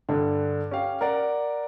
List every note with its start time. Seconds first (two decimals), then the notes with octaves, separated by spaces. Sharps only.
0.09 G2 D3
0.71 C#4 G4 F5
1.01 A#4 D5 F#5